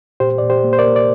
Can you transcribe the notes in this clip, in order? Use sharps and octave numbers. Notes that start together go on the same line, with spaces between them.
A#2 G4 C5
A#2 D5
G4 C5
A#3
C5
A#4 D5
A#3
D5